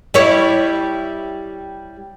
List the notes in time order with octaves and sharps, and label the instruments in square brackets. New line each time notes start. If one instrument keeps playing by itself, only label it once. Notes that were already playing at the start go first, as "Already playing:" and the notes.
[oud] G3 E4 C#5